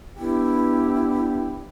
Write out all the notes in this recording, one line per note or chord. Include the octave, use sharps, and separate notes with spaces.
B3 D4 E4 G4